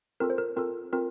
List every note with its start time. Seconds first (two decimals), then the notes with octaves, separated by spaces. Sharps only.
0.20 C4 F4 A4 A#4
0.30 C5
0.38 A#4
0.57 C4 F4 A4 A#4
0.93 C4 F4 A4 A#4